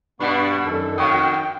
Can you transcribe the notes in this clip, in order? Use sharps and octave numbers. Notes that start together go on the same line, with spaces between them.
G2 B2 B3 D4 B5 C#6
F#2 D#3 A4
F2 F#3 F5 G5 C#6 D#6